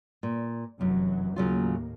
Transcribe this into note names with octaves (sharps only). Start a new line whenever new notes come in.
A#2
F1 F#2 E3 F#3
D#2 A2 C#3 F#3 A#3 F4